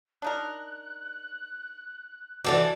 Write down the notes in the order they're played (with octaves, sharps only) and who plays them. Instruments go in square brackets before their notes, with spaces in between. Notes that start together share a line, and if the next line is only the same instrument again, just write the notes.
[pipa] D4 D#4 A#4 [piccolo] F#6
[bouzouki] E3 F3 D4 [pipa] C4 [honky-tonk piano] F#4 A4 D5